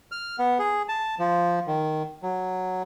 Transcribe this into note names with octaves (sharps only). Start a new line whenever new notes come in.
F6
B3
G#4
A5
F3
D#3
F#3